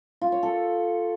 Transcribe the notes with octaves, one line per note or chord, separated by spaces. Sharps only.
F4
C#5
A4